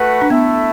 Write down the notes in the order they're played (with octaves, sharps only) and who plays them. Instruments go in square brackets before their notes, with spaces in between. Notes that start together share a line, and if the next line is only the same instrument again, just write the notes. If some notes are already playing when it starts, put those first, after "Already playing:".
Already playing: [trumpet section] A3 F#4 B4 F#5
[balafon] D4
[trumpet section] A3 E4 A4 E5 [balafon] B3